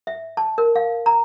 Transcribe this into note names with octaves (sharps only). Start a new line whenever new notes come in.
E5
A5
A#4
F5
A#5